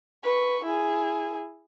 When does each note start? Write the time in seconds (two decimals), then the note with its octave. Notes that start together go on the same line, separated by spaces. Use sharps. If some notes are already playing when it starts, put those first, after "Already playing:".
0.24 B4 C#6
0.65 E4 G#4